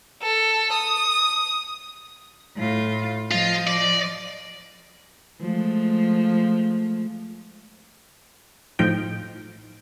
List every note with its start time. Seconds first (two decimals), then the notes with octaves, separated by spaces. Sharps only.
0.22 A4
0.73 D#6
2.57 A2 F4
3.31 F3 F4 D#5
3.67 D5
5.41 F3 G#3 A3
8.79 A2 F3 D#4 G5